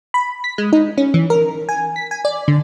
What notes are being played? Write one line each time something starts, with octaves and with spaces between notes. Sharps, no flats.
B5
B6
G#3
D#4
C#4
E3
A#4
G#5
B6
G#5
D5
D3